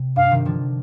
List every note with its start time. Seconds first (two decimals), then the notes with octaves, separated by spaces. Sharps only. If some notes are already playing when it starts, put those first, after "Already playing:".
Already playing: C3
0.16 G2 F5
0.31 C3 D#3
0.45 D3 F3